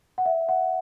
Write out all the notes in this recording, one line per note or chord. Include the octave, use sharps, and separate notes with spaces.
F#5
E5
F#5